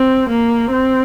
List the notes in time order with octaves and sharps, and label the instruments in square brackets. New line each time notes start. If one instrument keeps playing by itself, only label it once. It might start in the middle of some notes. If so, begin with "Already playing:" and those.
Already playing: [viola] C4
A#3
C4